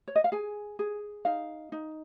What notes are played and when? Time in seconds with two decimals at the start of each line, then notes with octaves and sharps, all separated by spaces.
0.08 C#5
0.16 D#5
0.24 F5
0.32 G#4 G#5
0.79 G#4
1.25 D#4 F5
1.72 D#4